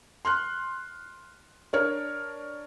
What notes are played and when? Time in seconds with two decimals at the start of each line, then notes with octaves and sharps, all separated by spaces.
0.25 C6 F6 F#6
1.73 D4 A#4 C#5 F6